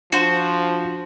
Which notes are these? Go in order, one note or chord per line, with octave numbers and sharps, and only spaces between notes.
F3 D4 F4 F#4 C5